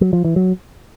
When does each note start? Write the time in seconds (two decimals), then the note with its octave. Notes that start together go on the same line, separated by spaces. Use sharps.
0.01 F#3
0.13 F3
0.25 E3
0.36 F#3